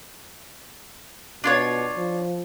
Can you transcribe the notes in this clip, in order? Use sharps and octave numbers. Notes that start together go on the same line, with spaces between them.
B2 D4 F4 C#5
F3